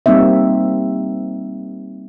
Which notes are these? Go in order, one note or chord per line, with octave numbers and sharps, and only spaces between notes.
G3 A#3 C4 D#4 E5